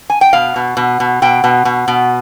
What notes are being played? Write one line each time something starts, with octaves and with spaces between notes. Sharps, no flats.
G#5
G5
B2 F5
B2
B2
B2
B2 G5
B2
B2
B2